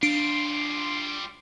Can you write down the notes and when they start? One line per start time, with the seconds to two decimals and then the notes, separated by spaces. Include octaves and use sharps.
0.03 G3 D4 F4 C7 D7